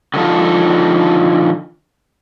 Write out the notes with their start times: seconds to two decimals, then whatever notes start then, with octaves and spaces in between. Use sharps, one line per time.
0.14 D3 D#3 F3 A4